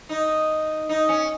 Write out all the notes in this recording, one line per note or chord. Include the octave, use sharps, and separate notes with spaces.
D#4
D#4
C#4